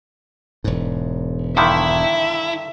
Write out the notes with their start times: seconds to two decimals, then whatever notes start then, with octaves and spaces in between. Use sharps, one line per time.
0.64 E1 G#2
1.57 G2 D3 D#3 E4 E5